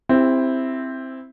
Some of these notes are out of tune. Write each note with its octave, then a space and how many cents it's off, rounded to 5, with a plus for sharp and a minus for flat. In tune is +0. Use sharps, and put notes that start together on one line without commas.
C4 +0 E4 +0 G4 +40